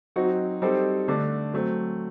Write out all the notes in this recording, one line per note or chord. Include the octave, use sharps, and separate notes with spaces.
F#3 C4 D#4 F#4
G3 C4 D#4 A4 C5
D3 A3 D4
F#3 A3 C4